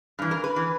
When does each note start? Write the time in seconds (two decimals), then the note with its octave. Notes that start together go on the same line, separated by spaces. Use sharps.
0.19 G2 E3
0.31 A#4
0.44 B4
0.56 E3